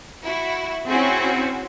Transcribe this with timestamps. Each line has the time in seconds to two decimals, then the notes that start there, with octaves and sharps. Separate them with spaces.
0.25 E4 F#4
0.87 C4 C#4 E4 F#4 G#4